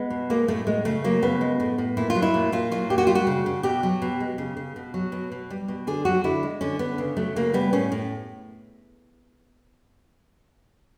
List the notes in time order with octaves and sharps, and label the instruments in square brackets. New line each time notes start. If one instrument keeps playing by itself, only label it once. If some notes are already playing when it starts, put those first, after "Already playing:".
Already playing: [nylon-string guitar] G#3 B3
B2
G#3 A#3
A2 A3
A2 G#3
C#3 A3
F#3 A#3
C#3 B3
G#3
A2
A2
A#2 E4
F4
F#3
E4
A#2
A#2 F4
F#3 F4
A#2 G4
F#4
G3 F4
F#4
C#3
C#3
B2 G4
F#3
B2
G#3
C#3
C#3
B2
F#3
B2
B2
G3
B2
D3 G#4
F#3 F#4
D3 E4
G#3
D3 C#4
D3 B3
C#3
F#3 A3
C#3 A#3
G3 B3
A2 C#4
A2